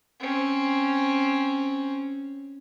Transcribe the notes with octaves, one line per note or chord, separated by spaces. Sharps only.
C4 C#4